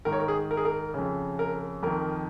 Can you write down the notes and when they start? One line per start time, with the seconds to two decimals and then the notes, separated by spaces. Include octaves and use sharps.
0.05 G#2 D#3 A#4
0.13 C#5
0.20 A#4
0.28 G#4
0.51 A#4
0.57 G#4
0.65 A#4
0.94 F2 C#3
1.39 A#4
1.83 F2 D#3 A#4